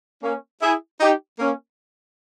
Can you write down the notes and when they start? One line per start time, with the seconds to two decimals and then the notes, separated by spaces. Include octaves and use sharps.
0.23 A#3 C#4
0.61 E4 G#4
1.00 D#4 G4
1.39 A#3 C#4